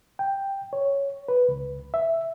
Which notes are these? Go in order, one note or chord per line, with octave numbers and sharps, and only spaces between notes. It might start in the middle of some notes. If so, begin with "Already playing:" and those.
G5
C#5
B4
C#2
E5